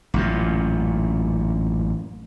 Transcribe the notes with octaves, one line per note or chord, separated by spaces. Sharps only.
A1 F#2 A#2